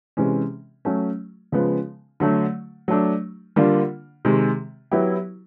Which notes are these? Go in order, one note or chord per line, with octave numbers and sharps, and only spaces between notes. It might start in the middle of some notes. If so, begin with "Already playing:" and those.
C3 E3 G#3 C#4
F#3 A3 C#4
C#3 F3 G#3 B3
D3 F#3 A3
F#3 A3 D4
D3 G3 A#3 D4 F4
C3 D#3 G#3
F#3 B3 E4 G4